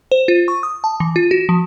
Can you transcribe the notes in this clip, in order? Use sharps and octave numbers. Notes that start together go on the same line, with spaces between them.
C5
F4
C#6
D#6
A5
E3
F4
F#4
F3